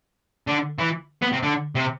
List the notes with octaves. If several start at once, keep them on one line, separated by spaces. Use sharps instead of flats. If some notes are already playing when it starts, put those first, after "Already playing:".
D3
E3
B3
C3
D3
C3